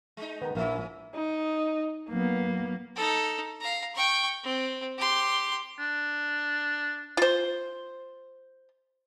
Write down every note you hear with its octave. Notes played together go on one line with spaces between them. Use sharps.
G#3 D#4
D#3 B3 A#5
A#1 F3 A#3 C#4 E4 F5
D#4
F#3 A#3 B3
D#4 A4
F5 A#5
G5 C#6
C4
G4 C6
D4
F4 C5